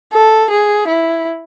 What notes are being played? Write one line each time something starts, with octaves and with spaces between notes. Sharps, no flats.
A4
G#4
E4